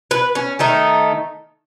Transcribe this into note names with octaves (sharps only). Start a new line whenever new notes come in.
B4
C#4
D#3 A3 D#4